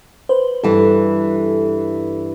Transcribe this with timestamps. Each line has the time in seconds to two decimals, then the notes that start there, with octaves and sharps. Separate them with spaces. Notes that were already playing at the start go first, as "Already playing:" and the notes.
0.29 B4 C5
0.63 G2 E3 A4